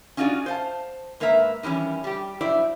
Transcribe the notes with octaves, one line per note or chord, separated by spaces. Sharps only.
C#4 D#4 F4 F#4 G#4 D5
C5 F5 A5
G#2 A#3 A#4 B4 E5 A#5
D#3 E3 G3 C#4
G3 G4
G2 F#3 E4 C5 D5